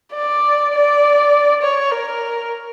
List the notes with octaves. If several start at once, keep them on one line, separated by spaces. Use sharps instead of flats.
D5
D5
C#5
A#4